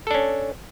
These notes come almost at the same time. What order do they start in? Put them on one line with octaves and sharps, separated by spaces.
A4 D4 C#4